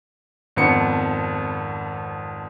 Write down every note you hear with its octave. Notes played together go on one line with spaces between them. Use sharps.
G#1 F2 B3 C#7